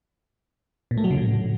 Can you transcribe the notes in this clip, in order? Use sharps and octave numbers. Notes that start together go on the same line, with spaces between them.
A#2
A3
F#3
C#3
A2